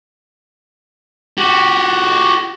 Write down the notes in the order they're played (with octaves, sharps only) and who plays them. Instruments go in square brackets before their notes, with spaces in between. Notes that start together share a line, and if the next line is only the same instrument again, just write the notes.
[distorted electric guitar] F#4 G4